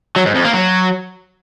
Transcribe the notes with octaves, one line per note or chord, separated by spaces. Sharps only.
F#3
G#2
F2
A#3
F#3